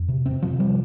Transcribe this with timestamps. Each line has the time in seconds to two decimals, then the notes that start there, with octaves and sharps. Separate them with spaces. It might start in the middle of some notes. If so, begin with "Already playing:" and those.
Already playing: F2
0.08 C3
0.26 C4
0.31 C3
0.42 F3
0.53 C3
0.60 G3